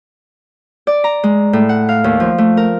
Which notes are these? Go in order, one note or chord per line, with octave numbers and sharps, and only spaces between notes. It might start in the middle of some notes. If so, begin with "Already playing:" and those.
D5
A#5
G#3
A2
F#5
F5
D#2
F3
A3
A#4